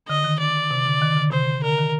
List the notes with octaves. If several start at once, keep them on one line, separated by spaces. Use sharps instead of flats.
D3 D#5
D#3
D5
C3
D3
D#3
D3
C3 C5
D3 A#4
D#3